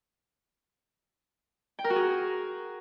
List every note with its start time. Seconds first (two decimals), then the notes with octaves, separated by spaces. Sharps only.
1.79 G5
1.84 A#4
1.90 F#4
1.96 G#4